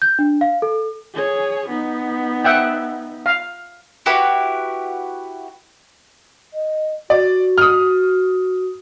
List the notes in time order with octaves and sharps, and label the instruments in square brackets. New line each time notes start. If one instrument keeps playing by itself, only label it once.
[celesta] G6
D4
F5
A4
[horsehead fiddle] G#4 C#5
B3 D#4
[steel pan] E5 F#5 G5
F5
[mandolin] E4 F#4 G4 B4
[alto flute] D#5
[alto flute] F#4 [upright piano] D5
[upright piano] D#6 F6